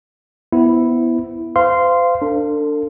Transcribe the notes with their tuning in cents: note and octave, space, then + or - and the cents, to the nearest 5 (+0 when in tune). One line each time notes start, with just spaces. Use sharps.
B3 +0 E4 +0 C5 -20
C5 -35 F5 -15 C6 -10
D4 +0 A4 +40